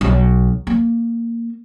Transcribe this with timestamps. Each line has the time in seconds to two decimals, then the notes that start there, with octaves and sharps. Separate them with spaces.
0.01 B1
0.67 A#3